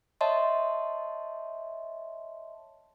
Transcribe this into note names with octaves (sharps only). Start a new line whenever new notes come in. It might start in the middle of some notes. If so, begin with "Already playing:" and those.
C#5 D#5 E5 A5 C6